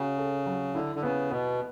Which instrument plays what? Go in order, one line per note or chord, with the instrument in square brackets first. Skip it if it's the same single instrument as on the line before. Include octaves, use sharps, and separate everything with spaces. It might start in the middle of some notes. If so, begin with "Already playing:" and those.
Already playing: [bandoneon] C#3 [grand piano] F#4
[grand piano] A4
F#3
[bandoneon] D3 [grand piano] E4
[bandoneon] D3
[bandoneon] C#3 [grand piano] B3
[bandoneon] B2 [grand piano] B3